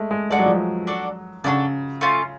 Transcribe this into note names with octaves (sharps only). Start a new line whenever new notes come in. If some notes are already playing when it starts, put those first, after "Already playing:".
Already playing: G#3 A3
G#3
G#3 D4 F#4 A4 D5
F#3
F3
F#3
D4 F#4 A4 D5
C#3 D4 F#4 A4 D5
A3 C#4 F4